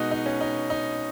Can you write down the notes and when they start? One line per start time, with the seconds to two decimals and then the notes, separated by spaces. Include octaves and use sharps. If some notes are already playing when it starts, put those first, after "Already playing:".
Already playing: B2 G#3 B3 D#4 F#4
0.11 D#4
0.26 C#4
0.41 D#4
0.70 D#4